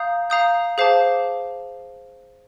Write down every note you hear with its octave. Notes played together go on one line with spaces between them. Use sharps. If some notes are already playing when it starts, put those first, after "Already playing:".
Already playing: F5 A#5 D#6 G6
F5 A#5 D#6 G6
G#4 C5 F5 A5 D6